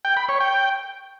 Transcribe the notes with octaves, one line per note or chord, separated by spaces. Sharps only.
G5
B5
C#5
G5